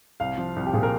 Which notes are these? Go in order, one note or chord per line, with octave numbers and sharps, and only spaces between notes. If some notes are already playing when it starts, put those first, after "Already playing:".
C2 F5
F3
C2
G4
A#2 G#4
A#4